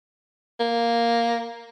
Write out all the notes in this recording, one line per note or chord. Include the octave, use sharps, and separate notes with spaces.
A#3